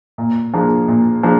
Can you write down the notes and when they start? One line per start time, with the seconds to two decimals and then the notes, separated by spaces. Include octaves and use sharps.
0.18 A#2
0.53 F3 A#3 D4 G#4
0.88 A#2
1.23 F3 A#3 D4 G#4